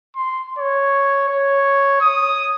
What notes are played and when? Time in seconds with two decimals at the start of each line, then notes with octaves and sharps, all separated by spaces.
0.16 C6
0.59 C#5
1.29 C#5
2.01 D#6